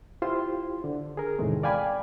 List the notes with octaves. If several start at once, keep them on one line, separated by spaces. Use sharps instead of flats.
E4 F4 G4 C5 C6
D3
G#4 A#4
E2 A2 C3 D#3 G#3 A3
D5 F5 G5 G#5 B5 D6